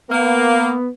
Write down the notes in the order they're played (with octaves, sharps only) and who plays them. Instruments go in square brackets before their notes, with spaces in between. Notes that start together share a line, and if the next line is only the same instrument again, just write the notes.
[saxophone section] A#3 [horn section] B3